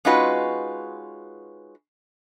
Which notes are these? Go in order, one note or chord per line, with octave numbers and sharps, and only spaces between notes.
G#3 C#4 D#4 F4 F#4 B4